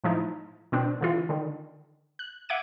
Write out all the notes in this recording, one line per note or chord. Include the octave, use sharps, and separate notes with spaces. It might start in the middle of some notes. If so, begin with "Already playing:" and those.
A2 F3 D#4 E4
B2 C4 D4
D3 E3 F4
D3 D#3
F#6
E5 F#5 D6 G#6 D7 D#7